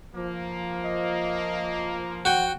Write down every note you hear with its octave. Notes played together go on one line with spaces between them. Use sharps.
F3 A#3
D#5
F#4 F#5 G5